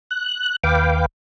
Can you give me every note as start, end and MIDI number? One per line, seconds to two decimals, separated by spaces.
0.11 0.56 90
0.64 1.06 39
0.64 1.06 71
0.64 1.06 77
0.64 1.06 79
0.64 1.06 86